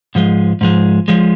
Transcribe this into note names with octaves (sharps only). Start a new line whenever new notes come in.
G#2 F3 G#3
G#2 F3 G#3
F3 G#3